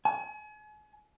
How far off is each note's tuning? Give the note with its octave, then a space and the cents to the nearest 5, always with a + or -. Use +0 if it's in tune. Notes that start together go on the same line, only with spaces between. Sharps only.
G#5 +40